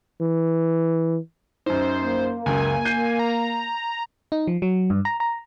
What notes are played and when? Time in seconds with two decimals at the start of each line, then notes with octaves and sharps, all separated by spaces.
0.21 E3
1.66 F#2 D#4 C5
2.03 A#3
2.46 C#2 F#2 G#5
2.85 G6 C7 D#7
3.19 A#5
4.32 D#4
4.47 F3
4.62 F#3
4.90 G2
5.05 A#5
5.20 A#5